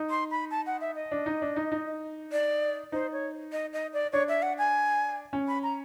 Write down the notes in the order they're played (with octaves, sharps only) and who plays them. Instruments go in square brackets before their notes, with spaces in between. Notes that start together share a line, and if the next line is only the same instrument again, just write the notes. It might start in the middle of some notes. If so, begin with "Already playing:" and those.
Already playing: [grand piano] D#4
[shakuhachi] C6
B5
A5
F#5
E5
D#5
[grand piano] D4
D#4
D4
D#4
D#4
[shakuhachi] D5
[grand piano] D#4 [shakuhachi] C5
[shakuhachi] C#5
D#5
D#5
D5
[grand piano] D4 [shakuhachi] C#5
[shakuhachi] E5
F#5
G#5
[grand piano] C#4
[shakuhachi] B5
A#5